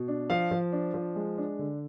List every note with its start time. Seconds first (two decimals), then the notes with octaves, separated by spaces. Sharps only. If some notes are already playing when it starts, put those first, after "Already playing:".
Already playing: B2
0.08 D4
0.30 F3 F5
0.51 F3
0.72 D4
0.94 F3
1.16 G#3
1.38 D4
1.59 D3